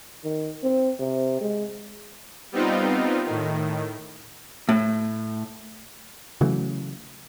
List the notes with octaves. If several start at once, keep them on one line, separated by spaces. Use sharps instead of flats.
D#3
C4
C3
G#3
G3 B3 C4 D#4 F4
A2 D#3
A2
C#3 E3 F#3 A3